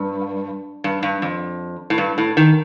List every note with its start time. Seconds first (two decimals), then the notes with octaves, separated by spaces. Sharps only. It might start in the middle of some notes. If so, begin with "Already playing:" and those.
Already playing: G2
0.84 G2
1.03 G2
1.22 F2
1.90 A2
1.98 G2
2.18 A2
2.37 D#3